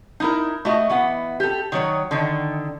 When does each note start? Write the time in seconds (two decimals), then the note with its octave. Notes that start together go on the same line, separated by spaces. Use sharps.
0.20 D#4 E4 A#4
0.65 A3 F#4 D#5
0.90 E3 B3 F#5
1.40 G4 A4
1.72 D#3 F#3 C#5
2.11 D3 D#3